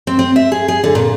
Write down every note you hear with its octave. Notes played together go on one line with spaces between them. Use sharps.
C4
C4
E5
G#4
G#4
D3
A#2